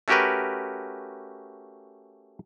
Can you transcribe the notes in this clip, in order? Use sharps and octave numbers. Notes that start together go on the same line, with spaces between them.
A3 C#4 F#4 G4 A#4 B4